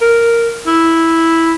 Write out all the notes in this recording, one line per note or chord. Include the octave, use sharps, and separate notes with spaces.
A#4
E4